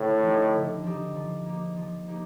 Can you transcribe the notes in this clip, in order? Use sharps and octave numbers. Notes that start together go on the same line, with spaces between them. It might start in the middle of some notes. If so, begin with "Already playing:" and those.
Already playing: A2 D3
F3 C4 D#4 G4
D3
F3 C4 D#4 G4
F3
A#3 D#4 G4
F3
A#3 D#4 G4